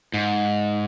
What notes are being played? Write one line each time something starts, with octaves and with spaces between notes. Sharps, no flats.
G#2